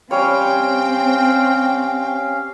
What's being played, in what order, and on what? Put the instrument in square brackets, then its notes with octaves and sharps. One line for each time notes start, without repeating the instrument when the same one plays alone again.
[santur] G3 C#5 [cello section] C4 [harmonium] C#4 F5 [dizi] G5